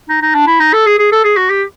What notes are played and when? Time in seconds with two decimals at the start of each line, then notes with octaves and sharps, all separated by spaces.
0.09 D#4
0.22 D#4
0.35 D4
0.47 E4
0.60 D#4
0.73 A4
0.87 G#4
0.99 G#4
1.12 A4
1.24 G#4
1.37 F#4
1.50 G4